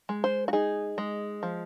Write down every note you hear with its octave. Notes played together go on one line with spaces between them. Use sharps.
G#3
C5
F#4
D#4 G#4
G#3
F3